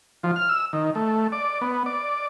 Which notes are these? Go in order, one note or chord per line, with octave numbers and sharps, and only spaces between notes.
F3
F6
E6
D#3
A3
D5
B3
D5